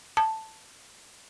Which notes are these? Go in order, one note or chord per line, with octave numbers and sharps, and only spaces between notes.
A5